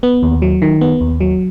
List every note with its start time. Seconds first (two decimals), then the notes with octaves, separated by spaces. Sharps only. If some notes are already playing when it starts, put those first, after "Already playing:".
0.03 B3
0.23 D#2
0.42 F#3
0.62 D#3
0.81 B3
1.01 D#2
1.20 F#3